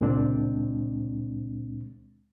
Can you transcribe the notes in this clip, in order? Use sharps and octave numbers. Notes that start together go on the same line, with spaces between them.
C#2 A#2 G#3 C4 D4